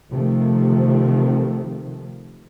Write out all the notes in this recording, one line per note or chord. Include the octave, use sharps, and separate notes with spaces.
C3 D#3 F3 A3